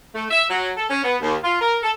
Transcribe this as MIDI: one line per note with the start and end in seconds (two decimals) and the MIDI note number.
0.15 0.24 57
0.29 0.44 76
0.50 0.70 54
0.77 0.85 69
0.89 1.02 61
1.04 1.15 59
1.21 1.36 39
1.44 1.58 65
1.61 1.77 70
1.82 1.90 69